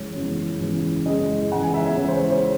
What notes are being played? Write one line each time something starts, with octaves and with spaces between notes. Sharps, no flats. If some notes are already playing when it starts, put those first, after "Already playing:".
Already playing: F#2 C#3 E3 G#3 C#5
F#2 C#3 E3 G#3
F#2 C#3 E3 G#3
F#2 C#3 E3 G#3 D#5
C#3 E3 G#3 F#5
G#5
E5
E5
C#3 E3 G#3 C#5
C5
C#5
C5
G#3